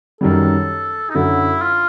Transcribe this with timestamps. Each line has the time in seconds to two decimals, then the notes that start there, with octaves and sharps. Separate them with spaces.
0.21 F#2 D#3 G3 A4
1.10 D#4
1.15 F#2 D3 F#3 E4
1.62 F4